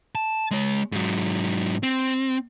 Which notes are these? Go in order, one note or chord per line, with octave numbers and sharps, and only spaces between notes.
A5
G#3 C#5
G#2 F#3
C4